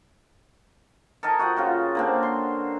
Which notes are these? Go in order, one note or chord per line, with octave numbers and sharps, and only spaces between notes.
A4 A#4 D#5 G#5
F#4 D#5 F#5 G5
C#3 F4 F#4
D3 A#3 C4
C6